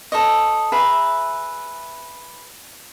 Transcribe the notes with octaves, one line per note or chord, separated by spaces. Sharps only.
A4 C#5 D#5
G#4 B4 E5 A#5